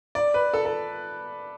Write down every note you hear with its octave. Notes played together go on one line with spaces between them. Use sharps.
D5
B4
A4
A4